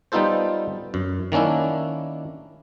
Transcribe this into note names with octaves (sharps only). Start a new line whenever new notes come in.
G3 B3 D#4 F4 A4 C5
F#2
D#3 A#3 C#4 D4 E4